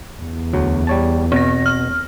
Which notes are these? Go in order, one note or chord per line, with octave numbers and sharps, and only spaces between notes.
E2
D2 F#3
G3 C#5 A5
B2 C4 A#6
F6